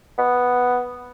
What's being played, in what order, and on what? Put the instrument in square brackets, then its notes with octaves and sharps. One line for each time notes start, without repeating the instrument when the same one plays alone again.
[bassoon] B3